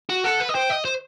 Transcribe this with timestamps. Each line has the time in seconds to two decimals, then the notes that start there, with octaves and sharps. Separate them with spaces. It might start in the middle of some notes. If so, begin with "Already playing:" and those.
0.09 F#4
0.24 A4 F#5
0.40 B4
0.49 D#5
0.54 C5 G5
0.70 D#5
0.85 C5